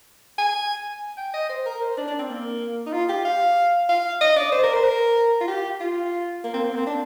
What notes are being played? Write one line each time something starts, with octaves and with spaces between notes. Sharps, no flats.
G#5
G5
D#5
C5
A#4
C5
D4
D4
C4
A#3
D#4
F4
G4
F5
F5
D#5
D5
C5
A#4
C5
A#4
F4
G4
F4
A#3
C4
A#3
C4
D4